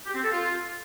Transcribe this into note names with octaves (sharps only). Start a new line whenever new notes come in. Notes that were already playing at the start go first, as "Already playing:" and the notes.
G4
C4
A4
F4